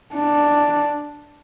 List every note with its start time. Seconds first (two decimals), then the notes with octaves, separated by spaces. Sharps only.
0.15 D4